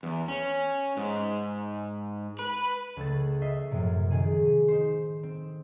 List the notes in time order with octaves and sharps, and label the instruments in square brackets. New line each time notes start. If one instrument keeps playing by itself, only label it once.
[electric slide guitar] E2
C#4
G#2
B4
[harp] C#2 A3 E6 A6
D#5 E5 B6 C7
F#2 A2 C3 F3
C3 D#3 G#4 D#7
D#4 C5
C4